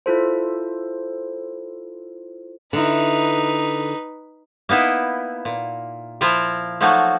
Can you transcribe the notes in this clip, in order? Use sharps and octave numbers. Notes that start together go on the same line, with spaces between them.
E4 F4 A4 C5
D3 D#4 E4 B4
A#3 B3 D#4 E4
A#2
F3 E4 F4 A#4
F3 F#3 A3 A#3 D#4 F#4